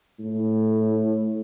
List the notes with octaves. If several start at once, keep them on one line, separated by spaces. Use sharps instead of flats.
A2